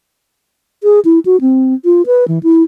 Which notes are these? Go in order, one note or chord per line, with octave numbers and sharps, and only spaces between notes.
G#4
E4
F#4
C4
F4
B4
E3
E4